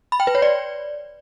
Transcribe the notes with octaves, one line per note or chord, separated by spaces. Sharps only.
B5
G5
B4
C#5
D5